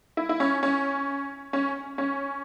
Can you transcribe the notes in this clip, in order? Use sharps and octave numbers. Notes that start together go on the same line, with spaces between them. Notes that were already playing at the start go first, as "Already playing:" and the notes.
E4
E4
C#4
C#4
C#4
C#4